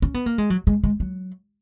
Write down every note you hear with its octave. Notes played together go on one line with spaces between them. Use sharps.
C#4
B3
A#3
G#3
F#3
G#3
G#3
F#3